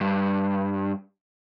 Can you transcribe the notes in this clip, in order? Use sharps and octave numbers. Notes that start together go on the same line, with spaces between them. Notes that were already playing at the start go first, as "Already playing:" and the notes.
G2